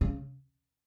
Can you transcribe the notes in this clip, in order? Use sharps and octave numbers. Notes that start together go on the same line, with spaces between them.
C#3